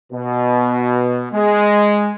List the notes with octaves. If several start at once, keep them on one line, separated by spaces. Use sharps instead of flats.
B2
G#3